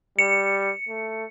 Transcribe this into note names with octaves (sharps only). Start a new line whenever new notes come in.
G3 C#7
A3